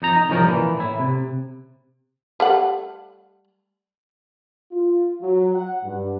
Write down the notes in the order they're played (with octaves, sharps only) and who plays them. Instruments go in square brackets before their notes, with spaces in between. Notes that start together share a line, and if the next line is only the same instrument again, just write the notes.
[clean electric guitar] F2 D#4 A#5
D#4
C2 F2 F3 C#4 A#4
A#2 E3
A2 E4
C3
[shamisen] G3 A3 F#5
[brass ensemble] F4
F#3
F#5
G2